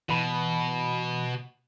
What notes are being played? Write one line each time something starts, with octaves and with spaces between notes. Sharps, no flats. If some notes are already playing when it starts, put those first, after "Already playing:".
B2 E3 B5